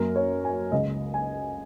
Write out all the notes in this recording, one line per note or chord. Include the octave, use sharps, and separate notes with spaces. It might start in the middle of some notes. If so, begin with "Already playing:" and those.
Already playing: F#2 F#3 A#3 A#4
C#5
G#5
C#2 C#3 G#3 D#5
G#5